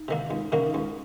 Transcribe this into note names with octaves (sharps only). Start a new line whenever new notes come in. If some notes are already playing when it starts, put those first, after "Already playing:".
Already playing: D#4
C3 D#3 A#3
C#2 D#4
C3 D#3 A#3 C#4
D#4
C#2 C#4